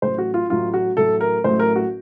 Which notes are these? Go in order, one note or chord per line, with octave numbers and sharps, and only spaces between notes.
A1 A2 F#3 A3 C5
F#4
F4
A1 A2 F#3 A3 F4
F#4
A1 A2 F#3 A3 A4
A#4
A1 A2 F#3 A3 C5
A#4
F#4